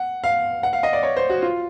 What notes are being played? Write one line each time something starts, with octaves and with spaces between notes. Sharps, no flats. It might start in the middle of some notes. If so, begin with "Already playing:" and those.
Already playing: F#5
F5
F#5
F5
D#5
D5
C#5
C5
F#4
F4